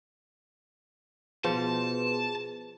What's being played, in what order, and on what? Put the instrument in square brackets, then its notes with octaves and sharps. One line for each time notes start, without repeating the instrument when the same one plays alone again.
[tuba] B2 [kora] F3 [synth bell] G#4 B4 C6 [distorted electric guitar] A5